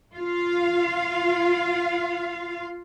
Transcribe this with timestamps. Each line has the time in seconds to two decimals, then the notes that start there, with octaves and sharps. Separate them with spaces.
0.15 F4 F5